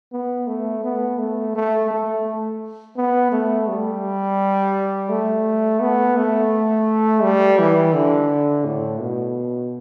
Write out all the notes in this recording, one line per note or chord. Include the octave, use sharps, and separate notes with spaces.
B3
A3
B3
A3
A3
A3
B3
A3
G3
A3
B3
A3
G3
E3
D3
A2
B2